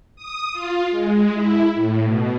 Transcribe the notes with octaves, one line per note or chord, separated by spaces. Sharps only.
D#6
F4
G#3
E4
A2
B2